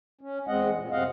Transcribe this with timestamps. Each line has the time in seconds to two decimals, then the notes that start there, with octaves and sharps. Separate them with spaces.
0.21 C#4
0.48 E2 G#3 C4 D#5 F#5
0.76 A#2
0.91 F#2 C3 C4 D#5 F5 F#5